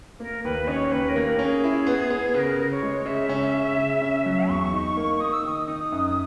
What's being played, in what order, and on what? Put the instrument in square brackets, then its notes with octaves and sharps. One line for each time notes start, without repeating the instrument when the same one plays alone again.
[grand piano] A#3 [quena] A#4
[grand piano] D#2 [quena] B4
[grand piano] C#4 [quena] C#5 D#5
[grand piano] D#2 [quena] B4
[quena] A#4
[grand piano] A#3
[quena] A#4
[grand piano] C#4
[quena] G#4
[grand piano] E4
B3
B3
[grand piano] C#3 [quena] B4
[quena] A#4
[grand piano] C#3
[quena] C#5
[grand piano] G#3
[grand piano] C#3 [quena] E5
[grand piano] C#4
C#3
C#3
C#4
F#3
[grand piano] E2 [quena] C#6
[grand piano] D#4
A#3
[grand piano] D#4 [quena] D#6
[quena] E6
[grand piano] D#3 [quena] D#6
[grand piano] D#4
F#2